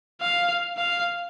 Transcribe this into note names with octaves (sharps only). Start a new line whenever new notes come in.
F5
F5